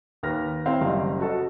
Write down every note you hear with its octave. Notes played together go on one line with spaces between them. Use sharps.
D#2 B4 F6 A#6
C4 E4 C#5 F5
F#1 G3 D#5
F#4 A4 D#5